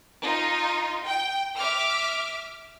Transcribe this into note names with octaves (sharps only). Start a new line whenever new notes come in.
D#4 F4
G5
E5 D6 F6